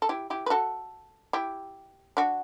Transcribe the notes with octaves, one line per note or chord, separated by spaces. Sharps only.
A4
E4 G4
E4 G4
B4
F#4 A4
E4 G4
D4 F#4